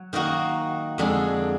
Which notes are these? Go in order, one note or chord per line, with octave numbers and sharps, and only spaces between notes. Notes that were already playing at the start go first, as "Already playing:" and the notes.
Already playing: F#3
D#3 A#3 D#4 F#4
F2 D3 G#3 D4 G#4